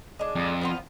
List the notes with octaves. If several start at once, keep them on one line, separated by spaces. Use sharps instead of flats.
G#3 D4
F2
F3 B3 F4